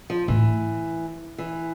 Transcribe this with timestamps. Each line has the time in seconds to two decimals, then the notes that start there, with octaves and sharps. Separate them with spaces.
0.10 F3
0.28 A2 E3
1.38 E3